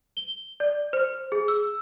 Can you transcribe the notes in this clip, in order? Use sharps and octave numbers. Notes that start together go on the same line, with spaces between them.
G7
D5
C5
G#4
E6